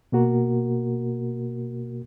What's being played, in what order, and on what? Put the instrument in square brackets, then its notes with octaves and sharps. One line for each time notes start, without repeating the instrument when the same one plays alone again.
[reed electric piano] B2 A#3 F#4 A#4